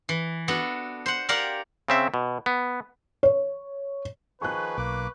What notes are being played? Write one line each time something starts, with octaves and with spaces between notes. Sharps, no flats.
E3
B3 D4 F#4 A4
C5 F#5
G4 A#4 D5 F5 F#5
C#3 C4 E5
B2
B3
C#5
D#3 F3 G#4 B4 C#6 F#6
B1 A#3 D6